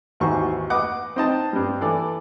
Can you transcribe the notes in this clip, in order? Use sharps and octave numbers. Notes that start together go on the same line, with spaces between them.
G#1 D#2 E3 F#4 C5 C#6
B4 D#5 F#5 D6
C4 D#4 B4 D#5 G5 A5
G2 G3
E3 A4 D5